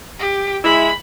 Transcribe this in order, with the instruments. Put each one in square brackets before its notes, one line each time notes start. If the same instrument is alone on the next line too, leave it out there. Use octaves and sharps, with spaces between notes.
[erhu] G4
[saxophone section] G#3 E4 [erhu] B5